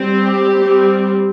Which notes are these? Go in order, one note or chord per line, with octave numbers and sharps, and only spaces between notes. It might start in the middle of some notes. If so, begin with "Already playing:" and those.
Already playing: G3 C4
G4
G3 C4